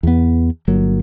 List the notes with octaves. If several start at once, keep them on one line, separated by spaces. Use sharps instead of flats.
E2 B3
G1 F#3 A#3